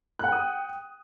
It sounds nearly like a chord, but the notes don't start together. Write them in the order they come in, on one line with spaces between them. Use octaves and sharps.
F#6 F#5 G5 D#6